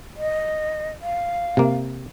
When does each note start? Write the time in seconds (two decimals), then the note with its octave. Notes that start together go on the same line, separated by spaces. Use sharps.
0.17 D#5
1.02 F5
1.57 C3 A#3